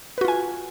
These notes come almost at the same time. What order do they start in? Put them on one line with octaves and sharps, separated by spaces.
B4 F#4 F4 G#5